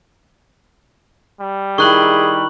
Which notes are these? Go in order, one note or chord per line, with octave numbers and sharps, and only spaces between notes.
G3
D#3 E4 G#4 C#6 F#6 F#7